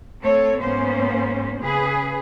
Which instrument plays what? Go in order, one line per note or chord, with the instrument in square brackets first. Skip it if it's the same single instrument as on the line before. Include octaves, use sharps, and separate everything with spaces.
[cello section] A3 C4 A4 C#5
G#2 A#3 B3 C#4 C5
C#3 G#4 B4